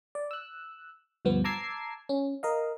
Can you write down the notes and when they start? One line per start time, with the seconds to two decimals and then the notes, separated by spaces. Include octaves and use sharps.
0.15 D5
0.31 E6 F#6
1.25 D2 G2 F3 B3
1.44 A5 A#5 D6 E6 G#6 C7
2.09 C#4
2.43 A#4 D#5 F5